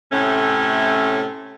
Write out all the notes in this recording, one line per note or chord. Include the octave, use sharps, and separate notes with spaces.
A2 C3 A3 C#4